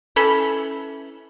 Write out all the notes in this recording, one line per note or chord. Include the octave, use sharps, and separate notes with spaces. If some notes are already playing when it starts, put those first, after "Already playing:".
E3 C#4 A4 B5